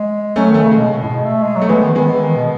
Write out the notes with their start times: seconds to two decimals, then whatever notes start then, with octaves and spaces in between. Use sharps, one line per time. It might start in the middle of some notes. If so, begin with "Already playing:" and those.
Already playing: G#3
0.36 F#3 A3 C#4
0.50 D#3 A3
0.63 C#3
0.71 B2 G#3
1.03 A2
1.07 B2
1.24 A3
1.43 G#3
1.55 F#3
1.61 A3
1.69 E3 G#3 B3
1.82 D#3
1.95 D#3 G#3 B3
2.09 E3
2.21 D#3
2.35 B2